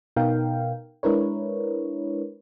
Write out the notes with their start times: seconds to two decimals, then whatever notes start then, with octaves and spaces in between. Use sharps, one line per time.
0.16 B2 B3 D#4 A#4 F5 G5
1.03 G#3 D4 E4 A#4 B4 C#5